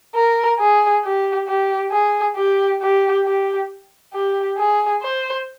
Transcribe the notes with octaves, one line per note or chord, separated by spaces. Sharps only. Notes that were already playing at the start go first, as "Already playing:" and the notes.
A#4
G#4
G4
G4
G#4
G4
G4
G4
G4
G#4
C5